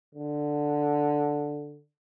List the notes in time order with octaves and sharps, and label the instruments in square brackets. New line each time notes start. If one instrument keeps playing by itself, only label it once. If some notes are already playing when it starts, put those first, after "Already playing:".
[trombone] D3